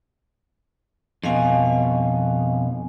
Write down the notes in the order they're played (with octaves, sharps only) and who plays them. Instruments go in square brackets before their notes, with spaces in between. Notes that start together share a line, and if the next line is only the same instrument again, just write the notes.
[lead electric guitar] F2 B2 [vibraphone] D#5 F5 G#5